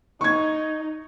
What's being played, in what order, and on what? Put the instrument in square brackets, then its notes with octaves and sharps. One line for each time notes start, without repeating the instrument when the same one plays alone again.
[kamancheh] D#4 [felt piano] C#6 G#6